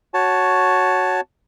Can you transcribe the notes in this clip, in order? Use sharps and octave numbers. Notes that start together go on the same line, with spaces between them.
F#4 C#5 A5